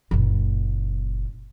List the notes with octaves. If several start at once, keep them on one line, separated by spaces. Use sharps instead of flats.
F#1 A#2